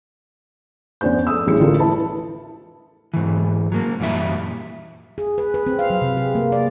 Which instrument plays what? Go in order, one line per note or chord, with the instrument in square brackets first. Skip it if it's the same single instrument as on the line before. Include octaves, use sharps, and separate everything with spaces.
[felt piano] F2 B3 C#4 D4 C5 G6
A4 D#6 E6
A1 G2 G#3 E4 C#7
A1 D3 F4 A4 A#4
E4 B4 A5
[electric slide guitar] G#2 E3
F#3 A#3
F#2 A#2 E3 G3 E5
[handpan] G#4
B4
B4
C4
F5
F#3
C3
G#4
A#3
D5